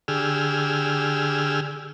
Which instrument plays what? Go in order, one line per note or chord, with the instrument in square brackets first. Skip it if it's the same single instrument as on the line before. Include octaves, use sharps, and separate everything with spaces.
[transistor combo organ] D3 G4 G#4 E6 F6